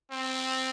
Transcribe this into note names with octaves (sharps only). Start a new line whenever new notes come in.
C4